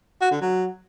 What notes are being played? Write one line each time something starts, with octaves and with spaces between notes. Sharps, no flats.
F#4
D3
F#3